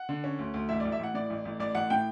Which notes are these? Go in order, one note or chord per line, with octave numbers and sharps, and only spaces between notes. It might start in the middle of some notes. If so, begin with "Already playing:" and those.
Already playing: F#5
D3
C#4
D2
D2
A1 E5
A1 D5
E5
A1 F#5
A2 D5
A1
A1
A1 D5
A1 F#5
A2 G5